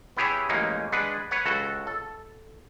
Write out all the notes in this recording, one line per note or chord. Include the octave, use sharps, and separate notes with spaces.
B3 E4 G4 G#4 C#5 E5
A1 G#3 A#3 C#4 D#4
G#3 D4 G#4 B4 F#5
B4 C#5 F#5
C#2 F#4 A4
A4